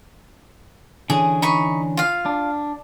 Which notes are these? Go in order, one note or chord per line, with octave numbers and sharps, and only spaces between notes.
D3 E3 C#4 G#4
D#4 B5 C#6
F4 F5
D4